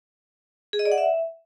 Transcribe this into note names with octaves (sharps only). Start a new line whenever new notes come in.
G#4
D#5
D5
F#5
E5